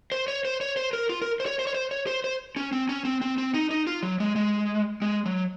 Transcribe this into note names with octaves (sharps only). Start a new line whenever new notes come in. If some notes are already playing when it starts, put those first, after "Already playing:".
C5
C#5
C5
C#5
C5
A#4
F4
A#4
C5
C#5
C5
C#5
C5
C#5
C5
C5
C#4
C4
C#4
C4
C4
C4
D#4
D#4
F4
F#3
G#3
G#3
G#3
F#3